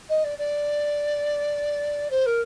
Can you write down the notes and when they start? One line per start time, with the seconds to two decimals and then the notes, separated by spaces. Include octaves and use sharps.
0.09 D#5
0.24 D5
0.38 D5
2.10 C5
2.25 A#4